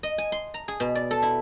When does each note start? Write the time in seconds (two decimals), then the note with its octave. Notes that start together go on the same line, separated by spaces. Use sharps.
0.03 D#5
0.18 G#5
0.32 C6
0.54 A#5
0.68 G#4
0.80 B2
0.95 D5
1.11 A4
1.23 E4